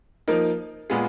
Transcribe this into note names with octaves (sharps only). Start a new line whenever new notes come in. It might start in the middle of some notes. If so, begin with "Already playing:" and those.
F3 A#3 D#4 A#4
A#2 G#3 B3 F4 G#4